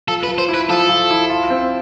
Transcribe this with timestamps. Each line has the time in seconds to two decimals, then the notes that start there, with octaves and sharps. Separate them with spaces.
0.08 F3 A4
0.23 B4
0.28 F3
0.38 C5
0.48 E4
0.54 B4
0.69 F3 A4
0.89 F3
1.11 E4
1.30 F4
1.50 C4